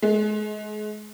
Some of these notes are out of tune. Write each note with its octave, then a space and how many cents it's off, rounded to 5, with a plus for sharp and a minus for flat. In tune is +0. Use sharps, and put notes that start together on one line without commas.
G#3 +35